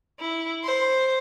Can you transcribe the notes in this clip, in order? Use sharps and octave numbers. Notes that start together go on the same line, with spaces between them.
E4
C5